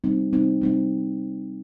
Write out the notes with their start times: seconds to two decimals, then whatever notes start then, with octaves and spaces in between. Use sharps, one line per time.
0.04 G3 C4 D#4
0.33 G3 C4 D#4
0.62 G3 C4 D#4